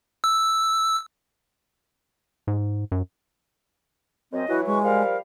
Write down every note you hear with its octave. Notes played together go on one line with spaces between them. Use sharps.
E6
G#2
F#2
F#2 C4 D#5
E3 F#3 E4 F#4
G#3 B4 C#6
F3 G3 A#4 F5